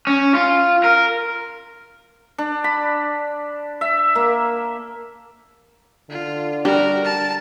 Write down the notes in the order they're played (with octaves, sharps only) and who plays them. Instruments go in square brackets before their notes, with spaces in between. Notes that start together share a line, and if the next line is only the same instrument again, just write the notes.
[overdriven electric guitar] C#4
F4
A#4
[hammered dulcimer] D4
B5
E5
A#3
[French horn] D3 [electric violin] F4
[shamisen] G3 [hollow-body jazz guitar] D4 [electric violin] F#4 A#4
[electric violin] A5